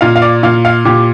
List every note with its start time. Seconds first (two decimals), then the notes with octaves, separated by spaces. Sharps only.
0.01 A#2 F5
0.16 F5
0.22 D5
0.43 A#2 F5
0.65 F5
0.85 A#2 G4